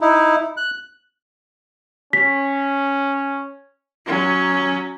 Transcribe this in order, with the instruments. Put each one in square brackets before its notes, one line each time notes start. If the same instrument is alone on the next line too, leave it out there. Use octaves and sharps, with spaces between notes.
[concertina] D#4 E4
F#6
[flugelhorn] C#4 [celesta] B6
[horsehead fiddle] F#3 C#4